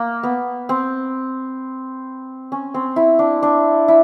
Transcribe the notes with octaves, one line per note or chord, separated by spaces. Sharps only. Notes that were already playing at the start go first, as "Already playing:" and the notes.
Already playing: A#3
B3
C4
C#4
C4
E4
D4
D4
E4